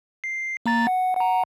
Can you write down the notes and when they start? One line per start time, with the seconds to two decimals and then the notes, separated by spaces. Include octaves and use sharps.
0.24 C7
0.66 A#3 A#5 A6
0.87 F#5
1.16 F#5 A#5